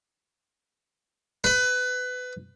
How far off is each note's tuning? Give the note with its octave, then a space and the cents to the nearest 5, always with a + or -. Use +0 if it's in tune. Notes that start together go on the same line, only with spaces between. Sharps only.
B4 +20